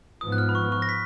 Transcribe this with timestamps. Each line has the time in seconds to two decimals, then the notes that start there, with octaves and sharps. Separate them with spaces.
0.21 G#2 F3 B3 D#6
0.32 F#6
0.38 F6
0.49 B5
0.55 C#6
0.72 C#6
0.82 A#6
0.89 B6